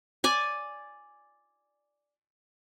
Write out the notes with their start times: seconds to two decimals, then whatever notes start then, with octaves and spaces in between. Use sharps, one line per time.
0.24 D5 G#5